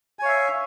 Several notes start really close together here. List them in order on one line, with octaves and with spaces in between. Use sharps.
G#5 C#5 F5 E5